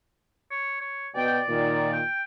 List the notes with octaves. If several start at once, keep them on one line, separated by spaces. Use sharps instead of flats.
C#5
C#5
B2 D5 G5
A#2 D#3
G5